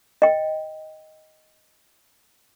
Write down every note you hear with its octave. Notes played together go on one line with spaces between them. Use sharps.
D#5 G5